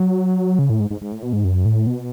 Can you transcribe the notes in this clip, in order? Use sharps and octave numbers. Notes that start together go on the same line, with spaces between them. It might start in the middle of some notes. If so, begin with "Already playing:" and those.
Already playing: F#3
C#3
A2
G#2
G#2
G#2
A2
B2
G#2
F#2
A2
B2